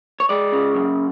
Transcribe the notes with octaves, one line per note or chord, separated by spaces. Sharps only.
C#5
G#3 D5
C#3
F#2